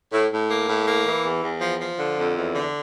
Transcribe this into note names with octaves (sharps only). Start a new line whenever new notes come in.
A2
A2
A#3
A2
A#3
E3
E2
E2
F3
F3
D3
F2
E2
D3